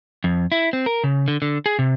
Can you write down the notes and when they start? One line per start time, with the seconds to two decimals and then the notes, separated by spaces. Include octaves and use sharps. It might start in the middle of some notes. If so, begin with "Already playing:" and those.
0.24 F2
0.52 E4
0.73 C4
0.86 A#4
1.04 C#3
1.28 D3
1.42 D3
1.66 G#4
1.79 C3